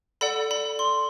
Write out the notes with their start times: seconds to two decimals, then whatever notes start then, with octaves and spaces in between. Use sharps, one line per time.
0.21 A4 D5 F#5 B5
0.51 B5
0.79 C6